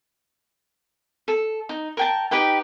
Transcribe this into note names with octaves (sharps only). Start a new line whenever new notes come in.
A4
D#4
A#4 G5 A5
D#4 G4 B4 G5